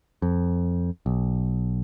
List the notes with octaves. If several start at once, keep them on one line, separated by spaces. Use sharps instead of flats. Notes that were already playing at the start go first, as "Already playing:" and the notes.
F2
B1